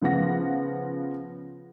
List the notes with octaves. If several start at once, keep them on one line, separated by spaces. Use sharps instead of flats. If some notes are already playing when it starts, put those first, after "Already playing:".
C#3 F3 B3 F#5 A#6